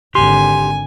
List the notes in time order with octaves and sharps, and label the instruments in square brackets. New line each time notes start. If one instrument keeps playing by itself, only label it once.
[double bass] G#1 D3 [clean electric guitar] G4 C6 [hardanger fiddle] G#5